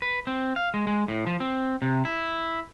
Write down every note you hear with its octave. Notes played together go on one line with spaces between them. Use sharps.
B4
C4
F5
G#3
G#3
A2
F3
C4
C3
E4